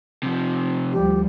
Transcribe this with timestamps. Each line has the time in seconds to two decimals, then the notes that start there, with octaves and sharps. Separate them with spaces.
0.23 C3 F3
0.92 D2 F3 G3 G4